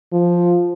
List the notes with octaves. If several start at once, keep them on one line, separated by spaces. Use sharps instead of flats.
F3